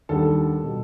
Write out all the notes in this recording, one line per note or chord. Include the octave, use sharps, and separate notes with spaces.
D#2 D3 G3 A4
B2 G3